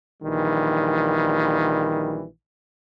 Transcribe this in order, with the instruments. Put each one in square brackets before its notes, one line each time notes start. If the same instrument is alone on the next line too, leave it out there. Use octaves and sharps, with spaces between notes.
[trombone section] A#1 D#3 E3 G3